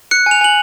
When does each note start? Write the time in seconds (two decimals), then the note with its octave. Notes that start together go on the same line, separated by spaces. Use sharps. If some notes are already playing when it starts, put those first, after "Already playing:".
0.11 F#6 C#7
0.26 G#5 F7
0.41 G#5 F#7